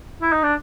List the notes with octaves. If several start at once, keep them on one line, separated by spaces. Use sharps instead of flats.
E4
D#4
D4